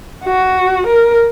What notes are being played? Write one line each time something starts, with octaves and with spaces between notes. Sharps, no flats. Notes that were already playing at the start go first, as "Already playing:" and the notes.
F#4
A#4